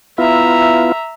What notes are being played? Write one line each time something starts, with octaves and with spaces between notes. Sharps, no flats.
B3 E4 F4 E5 A#5